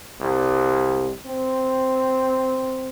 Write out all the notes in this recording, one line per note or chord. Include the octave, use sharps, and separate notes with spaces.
C2
C4